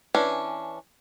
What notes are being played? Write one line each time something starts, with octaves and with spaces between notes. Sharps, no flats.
E3 C#4 D4